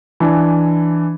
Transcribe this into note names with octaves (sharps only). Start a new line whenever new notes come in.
E3 D4 G#5